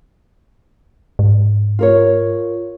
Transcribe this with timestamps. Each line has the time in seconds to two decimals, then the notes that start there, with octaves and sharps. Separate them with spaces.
1.19 G#2
1.79 F4 A#4 C#5